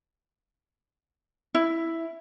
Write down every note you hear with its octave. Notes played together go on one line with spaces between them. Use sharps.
E4